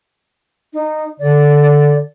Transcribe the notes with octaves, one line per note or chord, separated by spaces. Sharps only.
D#4
D3 D5